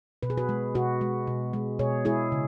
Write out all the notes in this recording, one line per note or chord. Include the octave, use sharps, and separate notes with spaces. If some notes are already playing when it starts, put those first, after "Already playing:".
B2 B4
G#4
F#4 B4
G#3
B2 F#4 B4
G#3
B2
G#3
B2 G#4 C#5
G#3 E4 G#4
C#3